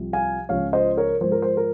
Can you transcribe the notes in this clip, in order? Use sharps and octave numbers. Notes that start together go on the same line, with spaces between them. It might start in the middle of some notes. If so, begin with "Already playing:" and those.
Already playing: C2 C3 F3
F5 G#5
C#2 C#3 F3 C#5 F5
C5 D#5
A#4 C#5
G#2 F3 C5
A#4
C5
A#4